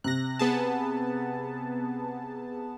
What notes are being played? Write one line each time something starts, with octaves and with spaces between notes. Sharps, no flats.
C3 F#6 A#6
B3 G#4 A5